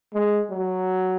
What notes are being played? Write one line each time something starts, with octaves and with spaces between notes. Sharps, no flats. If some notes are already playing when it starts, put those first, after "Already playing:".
G#3
F#3